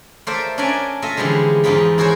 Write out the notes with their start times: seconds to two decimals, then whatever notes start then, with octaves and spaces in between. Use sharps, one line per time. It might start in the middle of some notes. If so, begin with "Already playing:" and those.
0.27 A3 F4 A#4 C5 D5 E5
0.58 C#4 D4 A#4 D5 E5 G#5
1.02 A3 F4 D#5 E5
1.17 D3 E3 F3 G3 G#3
1.64 E2 G#2 F3 D#4 F4 B5
1.98 E4 F#4 G#4 A#4 C5 C#5